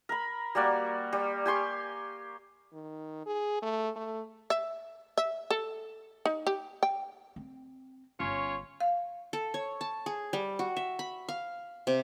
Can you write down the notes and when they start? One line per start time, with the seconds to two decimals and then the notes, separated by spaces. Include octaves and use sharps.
0.09 A#4 B5
0.55 G3 A#3 F#4 D5
1.13 G3
1.45 G4 G#5 C6 C#6
2.73 D#3
3.26 G#4
3.63 A3
3.96 A3
4.50 E5
5.18 E5
5.51 A4
6.26 D#4
6.47 G4
6.83 G5
7.36 C4
8.20 G1 C#4 F4 C#5
8.81 F5
9.33 A4
9.54 C#5
9.81 A5
10.06 G#4
10.33 G3
10.59 F#4
10.77 E5
10.99 B5
11.29 F5
11.87 C3